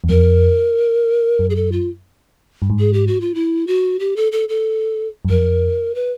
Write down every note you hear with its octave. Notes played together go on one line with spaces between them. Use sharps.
E2
F2 A#4
F#2
G#4
A4
F4
G2
G#2
G#4
G4
F#4
F4
E4
F#4
G4
A4
A4
A4
F#2
F2 A#4
B4